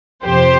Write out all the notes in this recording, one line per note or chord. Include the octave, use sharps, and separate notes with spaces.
F2 C3 F3 G4 C5